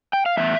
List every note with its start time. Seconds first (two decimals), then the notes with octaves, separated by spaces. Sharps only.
0.13 G5
0.26 F5
0.37 A2 E3 B3 E5